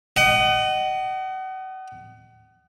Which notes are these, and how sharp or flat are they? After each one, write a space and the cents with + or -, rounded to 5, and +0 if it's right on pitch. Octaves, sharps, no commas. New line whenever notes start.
D#5 -15 F#5 +35